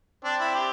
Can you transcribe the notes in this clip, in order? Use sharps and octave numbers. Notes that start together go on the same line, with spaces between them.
C4 D4
E4
G4